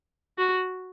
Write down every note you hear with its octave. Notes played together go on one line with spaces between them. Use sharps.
F#4